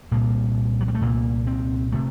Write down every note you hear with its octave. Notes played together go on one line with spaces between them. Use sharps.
C2 A#2 A#3
F#3
G3
A3
C2 A#2 A#3
C4
C3 A3